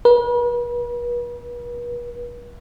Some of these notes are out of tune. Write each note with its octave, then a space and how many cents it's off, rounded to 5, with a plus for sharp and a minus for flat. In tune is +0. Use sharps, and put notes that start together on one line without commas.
B4 -40